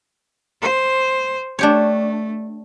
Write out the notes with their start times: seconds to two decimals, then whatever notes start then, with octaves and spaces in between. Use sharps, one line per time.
0.62 C5
1.59 A3 D4 G4 C#5